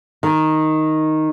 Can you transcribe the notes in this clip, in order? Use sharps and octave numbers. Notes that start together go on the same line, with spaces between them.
D#3